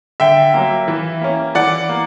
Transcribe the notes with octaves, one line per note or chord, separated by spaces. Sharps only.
D3 E5 G5
F#3 A#3
E3
A#3 C#4
E3 D5 F#5
A#3